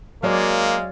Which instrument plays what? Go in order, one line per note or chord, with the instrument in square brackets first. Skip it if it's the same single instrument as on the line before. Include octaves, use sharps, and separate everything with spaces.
[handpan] F#3 C#5 D5 [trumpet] G#3 [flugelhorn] A#3 [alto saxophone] F5